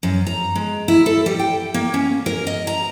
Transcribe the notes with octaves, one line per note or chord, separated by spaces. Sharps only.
F#2
A#5
G#3
E4
A4
G3
G5
A#3
C#4
A#4
D#5
A#5